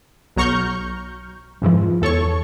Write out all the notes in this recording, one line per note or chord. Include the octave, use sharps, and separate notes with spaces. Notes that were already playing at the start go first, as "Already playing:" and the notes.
B1 F#3 A#5 C#6 F6 G6
F2 G#2 E3 F3
E2 A4 C#5 C#6